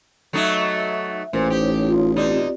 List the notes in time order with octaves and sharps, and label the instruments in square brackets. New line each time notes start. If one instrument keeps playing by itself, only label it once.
[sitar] F#3 A3 D#4 [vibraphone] E5
[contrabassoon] A1 [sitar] A#2 [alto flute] C5 [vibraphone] C6
[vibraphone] D#4 C#5 [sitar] G4
[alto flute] F4
[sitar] B2 D#4 [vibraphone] C4 F4 G4 [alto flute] D5